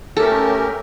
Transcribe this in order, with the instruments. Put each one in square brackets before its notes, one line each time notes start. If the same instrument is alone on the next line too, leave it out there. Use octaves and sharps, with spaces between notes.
[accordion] A3 C#4 G4 A#4 [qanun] A4